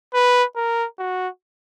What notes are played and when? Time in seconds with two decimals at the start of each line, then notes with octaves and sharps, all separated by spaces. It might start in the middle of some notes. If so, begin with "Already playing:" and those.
0.14 B4
0.56 A#4
0.99 F#4